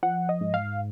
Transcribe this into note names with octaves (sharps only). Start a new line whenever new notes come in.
F3 F#5
D#5
G#2
F5